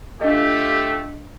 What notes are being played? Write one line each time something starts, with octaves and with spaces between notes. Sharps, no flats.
A3 D4 F4 G4 D#5